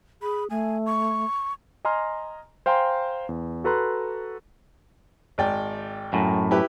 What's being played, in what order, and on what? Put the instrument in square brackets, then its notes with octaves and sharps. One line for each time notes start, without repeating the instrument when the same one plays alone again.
[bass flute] G#4 [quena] B5
[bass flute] A3 [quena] G#5
[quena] C#6
[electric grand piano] D#5 G#5 A#5 C6 F6
C5 F5 G5 G#5 A#5 C6
E2
F#4 A4 B4 A#5 C6 F#6
[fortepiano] G#1 D5 G5
[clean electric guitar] F#2 A2
[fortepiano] E4 G4 B4